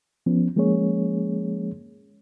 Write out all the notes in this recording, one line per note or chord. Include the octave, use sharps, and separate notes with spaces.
F3 B3 C#4
F3 G#3 A#3 C#4 G#4 C#5